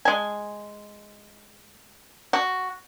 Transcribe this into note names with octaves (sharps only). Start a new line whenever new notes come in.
G#3 G#5
F#4